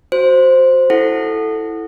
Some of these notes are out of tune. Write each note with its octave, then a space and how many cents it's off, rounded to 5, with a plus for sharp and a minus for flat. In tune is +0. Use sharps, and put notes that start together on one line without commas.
F#4 +0 C5 +0
E4 +0 A4 +0 F#5 -10